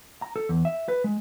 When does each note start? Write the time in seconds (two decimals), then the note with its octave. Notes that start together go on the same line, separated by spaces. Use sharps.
0.22 A#5
0.36 A4
0.49 E2
0.65 E5
0.88 B4
1.04 G#3